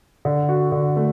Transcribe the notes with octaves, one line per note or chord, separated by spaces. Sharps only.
D3
F#4
D3
A3